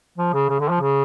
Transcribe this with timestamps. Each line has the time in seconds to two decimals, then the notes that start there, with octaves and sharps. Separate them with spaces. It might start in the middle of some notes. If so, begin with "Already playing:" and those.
0.18 F3
0.34 C#3
0.49 C#3
0.60 D3
0.70 F3
0.81 C#3